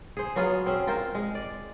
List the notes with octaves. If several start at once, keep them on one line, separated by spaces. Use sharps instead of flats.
G#4 C5
F#3 B3 F4 G#4
C4 C#4 G#4
F4 A#4 C5
G#3
D5